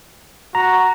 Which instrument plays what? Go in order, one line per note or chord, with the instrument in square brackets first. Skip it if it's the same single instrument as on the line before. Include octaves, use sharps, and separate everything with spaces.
[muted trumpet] F#4 [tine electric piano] A#5